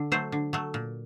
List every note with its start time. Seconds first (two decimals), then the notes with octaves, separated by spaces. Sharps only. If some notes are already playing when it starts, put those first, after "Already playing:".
Already playing: D3
0.12 F#3 A3 C5
0.32 D3
0.53 F#3 A3
0.74 A#2